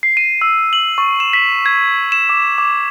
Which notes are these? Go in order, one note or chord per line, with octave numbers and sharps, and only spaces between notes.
C7
D#7
E6
F#7
C#6
E7
B6
G#6
E7
D6
D6